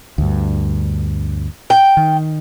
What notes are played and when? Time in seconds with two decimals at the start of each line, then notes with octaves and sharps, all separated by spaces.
0.18 D2 G2
1.70 G5
1.97 D#3